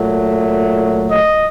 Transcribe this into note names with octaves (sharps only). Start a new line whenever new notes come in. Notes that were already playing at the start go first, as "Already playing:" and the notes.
Already playing: A#2 F#3 A3
D#5